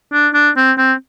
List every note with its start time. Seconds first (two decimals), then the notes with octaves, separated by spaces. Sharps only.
0.13 D4
0.34 D4
0.57 C4
0.78 C4